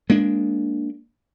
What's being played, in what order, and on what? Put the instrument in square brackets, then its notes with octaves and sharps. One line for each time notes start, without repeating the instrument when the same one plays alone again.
[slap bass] G#3 A#3 D4